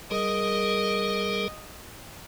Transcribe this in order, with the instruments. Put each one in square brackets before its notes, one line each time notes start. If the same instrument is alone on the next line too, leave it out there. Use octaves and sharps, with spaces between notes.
[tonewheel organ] G3 G#4 A#4 [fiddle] D#5